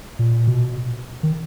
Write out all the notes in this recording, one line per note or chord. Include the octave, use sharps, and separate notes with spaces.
A#2
B2
D#3